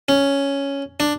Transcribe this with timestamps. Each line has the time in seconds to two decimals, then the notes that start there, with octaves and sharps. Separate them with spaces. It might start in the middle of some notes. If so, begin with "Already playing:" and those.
0.09 C#4
1.00 D4